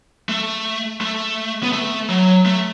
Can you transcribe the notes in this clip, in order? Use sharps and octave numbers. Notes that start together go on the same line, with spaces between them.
A3
A3
B3
A3
F#3
A3